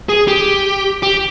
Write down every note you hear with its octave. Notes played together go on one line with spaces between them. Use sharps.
G#4
G4
G4